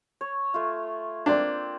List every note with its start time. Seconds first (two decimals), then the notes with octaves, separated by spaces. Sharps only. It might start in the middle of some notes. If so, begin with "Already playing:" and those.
0.21 C#5
0.54 A3 F4
1.26 A#3 C4 D4